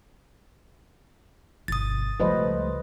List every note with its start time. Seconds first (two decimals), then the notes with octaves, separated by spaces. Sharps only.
1.68 G1 B2 D#6 A6
2.20 C#2 F3 G3 A3 B4 C5 D#5